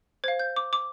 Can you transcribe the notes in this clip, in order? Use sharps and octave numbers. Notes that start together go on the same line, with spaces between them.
C5 F5 G#6
G6
D6
D6